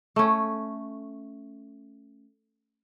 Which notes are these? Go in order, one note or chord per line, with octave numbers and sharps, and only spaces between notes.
A3 C#4